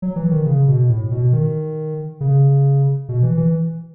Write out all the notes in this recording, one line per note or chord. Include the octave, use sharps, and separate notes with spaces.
F#3
E3
D#3
C#3
B2
A2
B2
D#3
C#3
B2
E3
E3